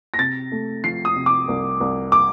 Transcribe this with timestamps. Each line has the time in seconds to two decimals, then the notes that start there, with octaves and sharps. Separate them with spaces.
0.14 A#6
0.18 C3 A6
0.52 A3
0.84 F3 C7
1.05 D#6
1.16 C3
1.26 D6
1.48 C2
1.80 C2
2.12 D6